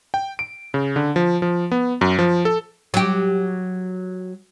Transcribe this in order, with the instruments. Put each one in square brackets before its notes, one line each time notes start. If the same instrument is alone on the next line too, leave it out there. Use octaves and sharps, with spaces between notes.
[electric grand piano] G5
D7
C#3
D3
F3
F3
B3
F#2
F3
A4
[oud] F#3 G4